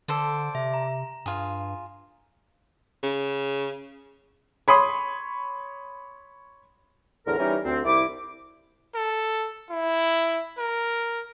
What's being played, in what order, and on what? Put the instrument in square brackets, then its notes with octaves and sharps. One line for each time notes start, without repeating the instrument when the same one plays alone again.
[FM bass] D3 [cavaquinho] A4 C5 D5
[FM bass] C3 [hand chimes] E5
[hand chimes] A#5
[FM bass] G2 [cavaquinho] F4 G#4
[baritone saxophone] C#3
[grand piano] C#5 B5 C6 D#6
[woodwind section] E2 A2 D3 A#4
E3 G3 C#4 D#4 A#4
D2 C4
C2 E4 D6
[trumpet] A4
E4
A#4